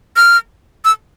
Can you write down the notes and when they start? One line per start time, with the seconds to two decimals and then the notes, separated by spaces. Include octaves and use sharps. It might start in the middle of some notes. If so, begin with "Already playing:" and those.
0.16 F6
0.85 E6